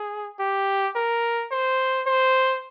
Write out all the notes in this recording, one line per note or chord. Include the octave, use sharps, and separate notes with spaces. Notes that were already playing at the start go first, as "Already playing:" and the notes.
Already playing: G#4
G4
A#4
C5
C5